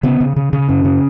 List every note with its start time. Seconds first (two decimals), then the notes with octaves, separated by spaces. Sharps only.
0.03 C#3 B3
0.20 C#3
0.36 C#3
0.53 C#3
0.68 F#2 C#4
0.85 C#3